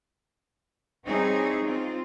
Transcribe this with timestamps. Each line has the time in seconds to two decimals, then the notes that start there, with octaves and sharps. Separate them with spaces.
1.05 G3 C4 D#4 E4 G#4 C#5
1.64 C4 F4